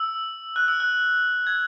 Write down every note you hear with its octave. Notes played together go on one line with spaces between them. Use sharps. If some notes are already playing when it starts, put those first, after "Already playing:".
Already playing: E6
F#6
E6
F#6
G#6